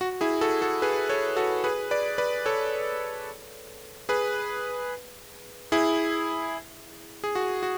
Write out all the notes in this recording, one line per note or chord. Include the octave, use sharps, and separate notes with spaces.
F#4
E4 G#4
F#4 A4
F#4 A4
G#4 B4
A4 C#5
F#4 A4
G#4 B4
B4 D5
B4 D5
A4 C#5
G#4 B4
E4 G#4
G#4
F#4
F#4